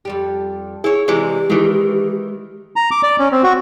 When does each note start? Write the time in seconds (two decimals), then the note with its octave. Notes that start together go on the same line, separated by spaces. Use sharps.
0.05 F2 G3 G4
0.84 E4 G#4 C#5
1.08 C3 E3 G#3 G4 D5
1.50 D#3 E3 G#3
2.76 A#5
2.91 D6
3.03 D5
3.19 C#4
3.32 C4
3.43 F#4